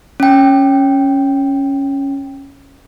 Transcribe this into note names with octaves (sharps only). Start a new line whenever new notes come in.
C#4 G5